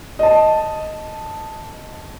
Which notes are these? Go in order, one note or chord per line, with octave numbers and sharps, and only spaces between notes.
D#5 A5